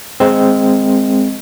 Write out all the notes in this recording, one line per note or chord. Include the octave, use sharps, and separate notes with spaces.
G#3 C4